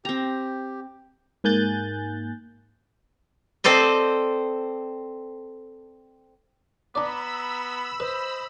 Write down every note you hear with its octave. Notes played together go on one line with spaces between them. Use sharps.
C4 G4 A#5
G#2 A#3 G#5 F#6 G6 A6
C4 A4 C5 D5 D#5
B3 D4 D5 A#5 B5 E6
B4 C5 D#5